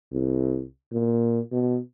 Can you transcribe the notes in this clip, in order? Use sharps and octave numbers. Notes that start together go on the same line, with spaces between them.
C2
A#2
B2